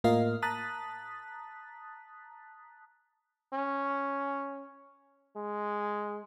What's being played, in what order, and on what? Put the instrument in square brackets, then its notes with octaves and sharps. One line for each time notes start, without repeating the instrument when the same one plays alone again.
[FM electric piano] A2 A#3 F4 A#4 D#5 F5
A5 A#5 D#6 F#6 A6 B6
[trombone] C#4
G#3